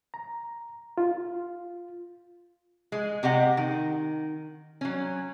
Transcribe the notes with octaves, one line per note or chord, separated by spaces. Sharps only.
A#5
F4
G#3
C3 G4 D#5 F#5
D#3
F#3 C#4